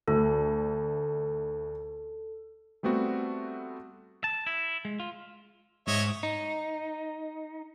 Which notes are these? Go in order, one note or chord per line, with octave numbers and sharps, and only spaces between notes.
D2 A4
G3 A3 B3 C4 F#4
A5
E4
G#3
F4
G#2 C#5 D#5 E5
D#4